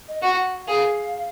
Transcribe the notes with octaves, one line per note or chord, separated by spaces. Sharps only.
D#5
F#4 F#5
G#4 F5